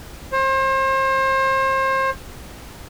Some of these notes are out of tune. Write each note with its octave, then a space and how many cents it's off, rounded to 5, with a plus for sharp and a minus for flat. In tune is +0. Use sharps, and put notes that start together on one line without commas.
C5 +35